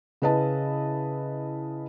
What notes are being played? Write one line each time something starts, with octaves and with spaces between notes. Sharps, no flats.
C#3 E4 B4 D#5 A5